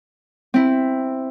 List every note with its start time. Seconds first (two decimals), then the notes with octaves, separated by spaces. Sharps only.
0.54 C4 E4